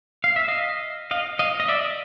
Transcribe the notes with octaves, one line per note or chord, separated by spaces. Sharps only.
F5
E5
D#5 F5
D#5 F5
D#5 F5
D#5
D5 E5